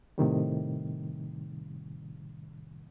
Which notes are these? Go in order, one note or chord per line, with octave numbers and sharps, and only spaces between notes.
A2 C3 D#3 G3